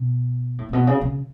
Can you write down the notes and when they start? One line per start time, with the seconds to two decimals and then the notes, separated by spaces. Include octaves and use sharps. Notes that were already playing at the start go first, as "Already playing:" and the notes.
Already playing: B2
0.58 A2
0.69 A2
0.73 B2
0.87 C#3
1.01 C#3